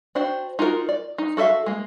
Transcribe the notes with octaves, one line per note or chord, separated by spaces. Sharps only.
D4 F#4 C5 G5
D#4 F4 F#4 A#4
D5
D#4
F#4 A4 B4 E5 F5
G#3 A#3